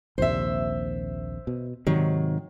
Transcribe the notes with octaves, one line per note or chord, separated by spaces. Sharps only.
A#1 D#2 C3 C5 E5
B2
G#2 C3 D#3 F#3